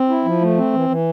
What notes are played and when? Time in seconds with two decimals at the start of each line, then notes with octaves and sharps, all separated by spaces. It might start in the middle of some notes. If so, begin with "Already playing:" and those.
Already playing: C4
0.09 E4
0.25 F3
0.41 A3
0.57 C4
0.73 E3
0.89 E3